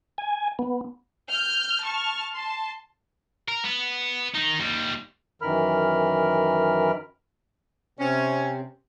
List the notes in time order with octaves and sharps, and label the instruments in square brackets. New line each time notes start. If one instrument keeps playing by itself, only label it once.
[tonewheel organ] G#5
B3
[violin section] F6 G6
A5 C#6 F6
A5 C6
[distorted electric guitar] A#4
B3
D#3 D#4
D#2 G3
[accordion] F#2 D#3 E3 A#4 B5 F6
[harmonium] C3 C4 [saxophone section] C#4